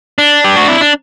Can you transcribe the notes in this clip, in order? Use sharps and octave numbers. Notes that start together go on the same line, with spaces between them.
D4
G4
F#4
E4
D4